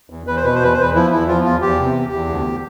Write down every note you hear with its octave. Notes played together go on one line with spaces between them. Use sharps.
E2
E2 B4
C5
B2 B4
C5
E2 B4
C5
E2 B4
F3 E4
E2 E4
F3 F4
E2 F4
E2 G4
C3
E2
E2
D2